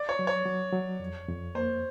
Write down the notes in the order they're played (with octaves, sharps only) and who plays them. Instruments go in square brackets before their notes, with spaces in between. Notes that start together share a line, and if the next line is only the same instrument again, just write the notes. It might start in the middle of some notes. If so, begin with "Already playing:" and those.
Already playing: [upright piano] D5
C#5
[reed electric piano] F#3
[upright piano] C#5
[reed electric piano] F#3
F#3
F2
F2
[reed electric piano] A#3 [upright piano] C5